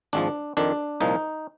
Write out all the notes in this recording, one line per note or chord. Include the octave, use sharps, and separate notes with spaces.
G#1 G#2 F3 D4
F2 D#3 D4
C2 A#2 F3 D#4